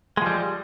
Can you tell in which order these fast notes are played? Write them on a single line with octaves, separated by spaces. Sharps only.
G#3 F3 G3